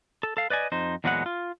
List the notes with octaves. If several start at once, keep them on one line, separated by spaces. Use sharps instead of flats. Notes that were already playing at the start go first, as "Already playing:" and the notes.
A4
A4 F5
B4 D5 D#5 G#5
F2 D#4 C5
E2 A#2 F#3 G#3 B3 F#5
F4